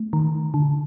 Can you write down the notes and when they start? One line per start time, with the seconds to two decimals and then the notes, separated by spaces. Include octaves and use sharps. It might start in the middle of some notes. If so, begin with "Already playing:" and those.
Already playing: A3
0.13 D#3
0.54 D3